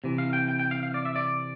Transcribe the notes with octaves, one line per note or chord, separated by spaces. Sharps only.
C3 E3
F5
G5
G5
G5
F5
F5
D5
E5
D5